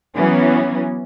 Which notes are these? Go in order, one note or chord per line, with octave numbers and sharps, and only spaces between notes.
E3 F#3 B3 C#4